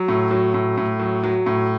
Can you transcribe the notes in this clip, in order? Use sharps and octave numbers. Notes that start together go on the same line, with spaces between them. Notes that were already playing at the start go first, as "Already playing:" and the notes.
Already playing: F#3
A2
F#3
A2
A2
F#3
F#3
A2